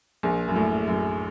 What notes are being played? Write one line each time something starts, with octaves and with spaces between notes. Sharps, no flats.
A#1 A#2
F#2
A2
F#2